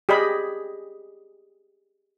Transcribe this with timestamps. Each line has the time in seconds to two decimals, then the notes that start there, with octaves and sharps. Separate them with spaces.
0.09 G4 G#4 D5 D#5 B5